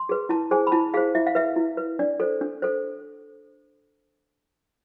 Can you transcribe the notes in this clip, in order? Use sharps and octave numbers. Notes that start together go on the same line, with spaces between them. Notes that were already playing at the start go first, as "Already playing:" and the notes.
Already playing: C6
G#4 B4
E4 A5
G#4 C5 G#5
B5
E4 A5
G#4 C5 F5
E4 E5
F5
B4 E5
E4
B4
D4 D5
A4 C5
D4
A4 C5